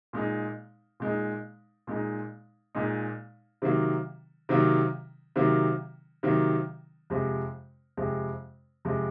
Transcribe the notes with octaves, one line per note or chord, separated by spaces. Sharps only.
A#2 G#3 D#4
A#2 G#3 D#4
A#2 G#3 D#4
A#2 G#3 D#4
C3 D#3 F#3 A#3
C3 D#3 F#3 A#3
C3 D#3 F#3 A#3
C3 D#3 F#3 A#3
F2 C3 F3 G#3
F2 C3 F3 G#3
F2 C3 F3 G#3